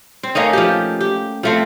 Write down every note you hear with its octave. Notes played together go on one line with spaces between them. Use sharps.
C4
A3 A#3 C#4 D#4
F3 G4
G4
F3 A3 C4